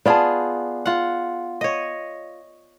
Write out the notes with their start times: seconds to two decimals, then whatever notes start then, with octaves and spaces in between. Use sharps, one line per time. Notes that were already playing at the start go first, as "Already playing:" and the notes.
0.06 B3 F4 G#4 D5 A5
0.86 F4 F#5
1.61 C#5 D#5